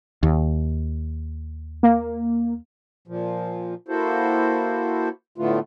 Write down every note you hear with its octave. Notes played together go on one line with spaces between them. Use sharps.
D#2
A#3
A#2 F3
A#3 E4 F#4 A4 C5
A2 D3 A3 B3 F4